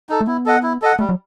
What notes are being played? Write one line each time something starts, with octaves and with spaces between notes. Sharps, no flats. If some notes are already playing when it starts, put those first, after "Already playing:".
D#4 A4
A3
B3 E4
A4 D#5 F#5
E4
A4 D#5 F#5
G3 A3
F#3